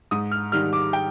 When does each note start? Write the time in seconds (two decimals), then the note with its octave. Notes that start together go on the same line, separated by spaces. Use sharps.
0.11 G#2 D#6
0.32 F6
0.52 D#3 G3 F6
0.73 D6
0.93 G5